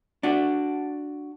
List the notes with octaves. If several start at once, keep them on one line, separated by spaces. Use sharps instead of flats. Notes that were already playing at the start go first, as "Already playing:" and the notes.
D4 F#4